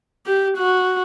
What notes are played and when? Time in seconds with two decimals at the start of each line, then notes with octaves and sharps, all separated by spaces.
0.26 G4
0.58 F#4